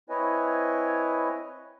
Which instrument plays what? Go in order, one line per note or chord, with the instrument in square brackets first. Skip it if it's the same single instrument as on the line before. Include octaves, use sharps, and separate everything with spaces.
[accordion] C4 E4 B4 C#5 D#5 G#5